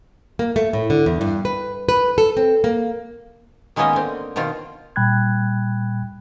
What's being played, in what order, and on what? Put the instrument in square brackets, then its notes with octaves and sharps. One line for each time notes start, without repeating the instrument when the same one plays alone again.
[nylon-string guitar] A#3
A3
A2
D3
E2
G2
B4
B4
A4
C4
A#3
[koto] D#3 G#3 A#3 B3 C#4 D#5
D3 C4
B2 D#3 C4 F4
[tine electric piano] A#2 G3 G5 B5 F#6 G#6